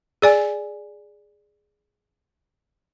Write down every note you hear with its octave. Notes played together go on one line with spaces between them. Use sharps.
G#4 D5 G#5